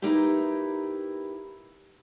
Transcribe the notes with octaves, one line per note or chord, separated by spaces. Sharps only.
A#3 D#4 E4 G4 B4